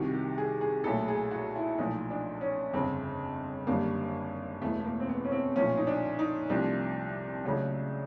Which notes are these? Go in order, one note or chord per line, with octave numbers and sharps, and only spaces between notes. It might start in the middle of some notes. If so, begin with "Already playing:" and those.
Already playing: C2 C3 D#3 F#4
G4
G#4
G#4
B1 A#2 F#3 A3 A4
G#4
F#4
E4
B1 A#2 F3 A3 D#4
D4
C#4
G1 F2 C#3 C4
G#1 F#2 D3 G3 A#3
E1 E2 B2 A3
A3
A#3
C4
B3
C#4
C4
B1 A#2 F3 A3 C#4
D#4
D4
D#4
C2 C3 F3 A3 D4
C#2 C#3 F#3 A3